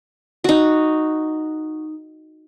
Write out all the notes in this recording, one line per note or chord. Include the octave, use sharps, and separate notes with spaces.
D#4 F#4